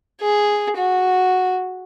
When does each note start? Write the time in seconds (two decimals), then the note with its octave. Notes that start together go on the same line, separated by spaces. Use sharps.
0.21 G#4
0.77 F#4